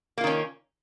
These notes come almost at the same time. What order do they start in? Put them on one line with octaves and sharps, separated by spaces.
A#3 F4 D#3 C#4